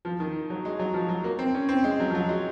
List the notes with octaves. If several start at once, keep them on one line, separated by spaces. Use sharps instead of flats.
F3
D#3
F#3
G#3
F#3
F3
F#3
A#3
C4
C#4
C4
G#3
F#3
F3
F#3
G#3